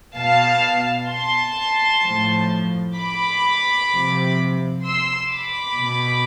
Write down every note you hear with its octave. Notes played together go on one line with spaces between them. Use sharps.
B2 F5 A5
A5 C6
A2 F3
B5 D6
C3 F3
C6 E6
B5 D6
B2